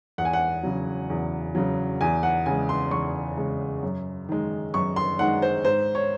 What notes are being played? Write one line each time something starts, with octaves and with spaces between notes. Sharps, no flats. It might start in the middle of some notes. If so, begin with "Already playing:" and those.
E2 F#5
G#5
F#5
C#3 F#3
E2
C#3 F#3
E2 G#5
F#5
C#3 G#3 G#5
C6
E2 C#6
C#3 G#3
F#2
D#3 G#3
F#2 C#6
C6
D#3 G#3 F#5
C5
G#2 C5
C#5